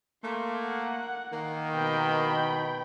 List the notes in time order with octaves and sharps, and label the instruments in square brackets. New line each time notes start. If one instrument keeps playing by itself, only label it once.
[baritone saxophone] A3 [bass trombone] A#3 [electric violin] C6
[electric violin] F#5
[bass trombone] D#3 [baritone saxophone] A#3
[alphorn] B2 [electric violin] G5 B5